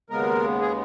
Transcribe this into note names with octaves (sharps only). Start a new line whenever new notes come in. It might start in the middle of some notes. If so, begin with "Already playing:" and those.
D#2 C#3 G#3 B3 A#4
G#4